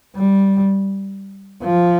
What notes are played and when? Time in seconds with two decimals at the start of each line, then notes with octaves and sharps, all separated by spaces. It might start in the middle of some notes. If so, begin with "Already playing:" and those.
0.16 G3
1.63 F3